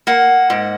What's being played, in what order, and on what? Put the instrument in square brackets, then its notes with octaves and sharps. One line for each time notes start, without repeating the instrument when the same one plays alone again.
[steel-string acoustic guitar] A#3 F#5
G#2